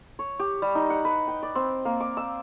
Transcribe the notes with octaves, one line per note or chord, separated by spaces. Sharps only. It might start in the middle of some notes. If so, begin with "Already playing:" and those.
C#5
G4
G3
D#4
F#5
B4
G5
D5
C4
A#3
D6
E6